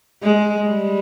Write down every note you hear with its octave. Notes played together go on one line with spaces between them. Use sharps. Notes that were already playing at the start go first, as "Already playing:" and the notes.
G#3
G3